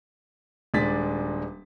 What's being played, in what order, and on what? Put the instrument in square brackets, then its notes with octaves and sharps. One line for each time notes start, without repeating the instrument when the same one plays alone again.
[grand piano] D#1 G#3 D4 A6 B6